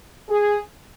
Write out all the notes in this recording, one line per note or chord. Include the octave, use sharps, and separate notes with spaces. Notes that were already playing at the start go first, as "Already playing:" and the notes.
G#4